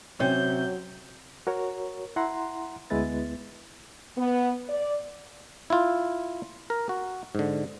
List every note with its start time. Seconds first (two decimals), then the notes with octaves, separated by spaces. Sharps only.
0.20 C3 F#3 C#4 G6
1.47 F#4 A#4 C#5
2.16 E4 F#5 A#5 C6
2.90 D2 G#3 B3 E4 B4 A6
4.17 B3
4.69 D5
5.70 E4 F4
6.70 A#4
6.89 F#4
7.35 G#2 D3